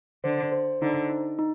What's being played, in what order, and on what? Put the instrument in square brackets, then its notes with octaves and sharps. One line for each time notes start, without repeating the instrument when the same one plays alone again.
[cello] D3 [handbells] C5
[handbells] C5
[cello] D3 [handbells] D#4
[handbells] D#4
D#4